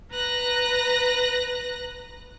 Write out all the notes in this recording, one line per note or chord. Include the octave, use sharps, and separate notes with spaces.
B4 A#5 F#6 A#6